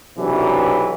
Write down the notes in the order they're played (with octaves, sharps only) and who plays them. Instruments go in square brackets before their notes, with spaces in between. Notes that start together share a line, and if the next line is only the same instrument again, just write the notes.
[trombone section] B1 C3 E3 F#3 D4